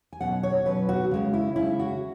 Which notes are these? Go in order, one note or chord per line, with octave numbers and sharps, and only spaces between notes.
G#5
B2 F#3 C#4 F#5
C#5
B2 F#3 C#4 B4
F#4
C#3 G#3 C#4
E4
C#3 G#3 C#4 E4
F#4